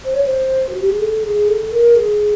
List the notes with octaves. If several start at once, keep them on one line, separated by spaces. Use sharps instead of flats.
C5
C#5
C5
F#4
G4
G#4
A4
G#4
A4
A#4
G#4